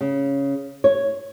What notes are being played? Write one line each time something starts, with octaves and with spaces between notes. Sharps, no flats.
C#3
C#5